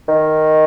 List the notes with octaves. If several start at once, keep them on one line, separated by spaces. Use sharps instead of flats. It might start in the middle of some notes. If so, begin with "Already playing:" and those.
D#3